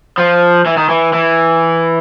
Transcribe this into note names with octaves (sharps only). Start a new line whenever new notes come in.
F3
E3
D#3
E3
E3